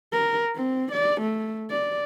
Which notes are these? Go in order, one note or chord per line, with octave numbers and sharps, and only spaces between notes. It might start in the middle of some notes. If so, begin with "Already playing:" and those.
A#4
C4
D5
A3
D5